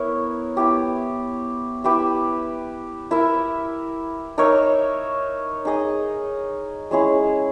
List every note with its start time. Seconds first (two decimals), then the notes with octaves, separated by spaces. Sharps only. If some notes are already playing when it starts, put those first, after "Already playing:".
Already playing: B3 E4 A#4 C#5
0.57 B3 E4 G4
1.84 E4 G4 B4 E5
3.11 E4 A#4 E5
4.38 D#4 A#4 C#5 E5
5.65 D#4 G#4 D#5
6.91 G#3 C#4 E4 G#4